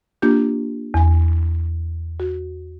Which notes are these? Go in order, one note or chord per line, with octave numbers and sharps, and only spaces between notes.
A#3 D4 F4 G4 G6
E2 G#5
F#4